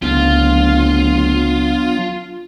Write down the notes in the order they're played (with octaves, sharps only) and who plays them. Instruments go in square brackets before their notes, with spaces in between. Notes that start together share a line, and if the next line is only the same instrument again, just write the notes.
[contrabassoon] D1 [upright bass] C#2 [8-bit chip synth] F#3 B3 D4 [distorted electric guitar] F4